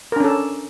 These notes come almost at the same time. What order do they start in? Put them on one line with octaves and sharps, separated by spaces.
A#4 D4 C#4 A4